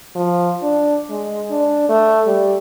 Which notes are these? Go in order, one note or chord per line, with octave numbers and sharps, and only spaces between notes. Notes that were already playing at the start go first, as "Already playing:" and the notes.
F3
D4
G#3
D4
A3
G3